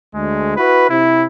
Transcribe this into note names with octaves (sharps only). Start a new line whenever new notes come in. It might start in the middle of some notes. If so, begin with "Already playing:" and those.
D2 G#3
E4 F#4 B4
C3 E4